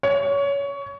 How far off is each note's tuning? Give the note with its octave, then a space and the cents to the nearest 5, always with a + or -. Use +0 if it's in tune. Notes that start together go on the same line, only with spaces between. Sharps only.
C#5 +20